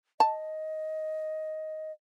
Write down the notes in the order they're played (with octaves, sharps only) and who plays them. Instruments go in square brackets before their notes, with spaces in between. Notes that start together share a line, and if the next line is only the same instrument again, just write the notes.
[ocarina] D#5 [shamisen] A5